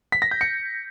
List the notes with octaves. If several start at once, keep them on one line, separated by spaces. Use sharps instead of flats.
B6
A#6
G6
C#7